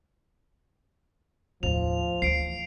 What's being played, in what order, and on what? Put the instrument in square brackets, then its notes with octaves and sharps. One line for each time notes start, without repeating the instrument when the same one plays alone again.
[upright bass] D#2 A2 [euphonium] F3 [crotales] F7
[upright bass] D2 E3 [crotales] C7 D7